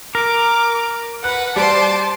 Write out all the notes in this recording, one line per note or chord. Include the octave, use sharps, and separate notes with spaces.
A#4 D6
B4 F#5 F#6
G3 C5 D5 A5 C6 D6